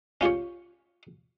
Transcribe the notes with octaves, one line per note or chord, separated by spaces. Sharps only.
C#4 F4 G4 C#5